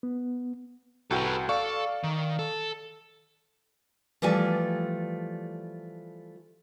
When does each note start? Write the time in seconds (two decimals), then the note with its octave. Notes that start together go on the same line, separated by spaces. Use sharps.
0.03 B3
1.11 C2 F#4 A4 B4 G5
1.49 A4 D5 F5 C#6
2.04 D#3
2.39 A4
4.22 E3 F3 G3 A3 D5 G#5